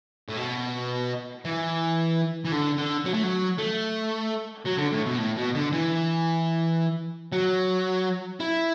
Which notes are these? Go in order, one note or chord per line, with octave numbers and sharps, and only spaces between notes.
A2
B2
E3
E3
D3
D3
F#3
A3
F#3
A3
F#3
D3
A2
B2
A2
B2
D3
E3
F#3
E4